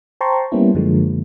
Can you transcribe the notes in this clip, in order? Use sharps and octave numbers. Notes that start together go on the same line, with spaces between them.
C5 G5 A5 A#5 C6 C#6
G3 A#3 B3 C#4 E4
F#2 D3 F3 G#3 A#3